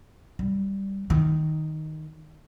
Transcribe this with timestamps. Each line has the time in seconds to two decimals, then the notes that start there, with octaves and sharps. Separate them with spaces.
0.39 G3
1.10 D#3